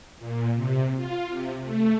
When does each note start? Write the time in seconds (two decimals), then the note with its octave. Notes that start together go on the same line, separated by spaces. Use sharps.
0.19 A#2
0.55 C3
0.96 F4
1.30 C3
1.63 A3